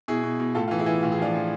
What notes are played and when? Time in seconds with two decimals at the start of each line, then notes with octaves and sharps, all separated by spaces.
0.08 B2 E4 G#4
0.24 B2
0.40 B2
0.55 A2 F4 A4
0.68 E3 F4
0.78 E4 G#4
0.86 E3
1.03 A2 F4
1.12 G#4
1.18 F3 D4 F4
1.34 F3